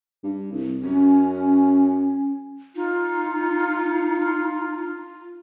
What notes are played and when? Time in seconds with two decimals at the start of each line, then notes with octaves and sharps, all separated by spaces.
0.23 G2
0.52 C2
0.83 F#2 C#4
2.75 D#4 F4